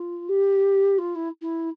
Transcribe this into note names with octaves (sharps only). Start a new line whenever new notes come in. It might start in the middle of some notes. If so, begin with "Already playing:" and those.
Already playing: F4
G4
F4
E4
E4